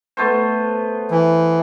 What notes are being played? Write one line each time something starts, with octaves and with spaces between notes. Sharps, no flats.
A3 B3 C5
E3